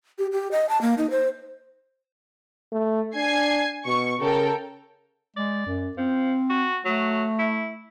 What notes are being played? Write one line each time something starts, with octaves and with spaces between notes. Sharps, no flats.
G4
G4
D#5
A5
A#3
D#4
C5
A3
D4 G#5 G#6 C7
B2 C#6
C#3 A4 A#4 G5
G#3 D5
F#2
F3 C4
F#4
F#3 A3
E4